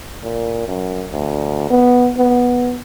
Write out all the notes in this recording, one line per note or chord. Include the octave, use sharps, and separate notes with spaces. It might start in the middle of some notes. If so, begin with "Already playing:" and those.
A#2
F#2
D2
B3
B3